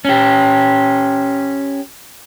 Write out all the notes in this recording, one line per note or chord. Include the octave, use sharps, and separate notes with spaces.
C#4 G4